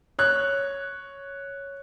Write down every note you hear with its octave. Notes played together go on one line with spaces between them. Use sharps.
C#5 F#6